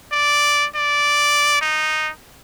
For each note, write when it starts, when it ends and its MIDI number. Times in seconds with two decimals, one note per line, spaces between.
0.13 0.66 74
0.76 1.58 74
1.61 2.10 63